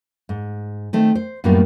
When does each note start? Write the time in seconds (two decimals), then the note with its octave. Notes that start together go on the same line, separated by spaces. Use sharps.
0.29 G#2
0.93 D#3 A3 C4
1.15 C5
1.44 F#2 A2 G3 A#3 B3 F4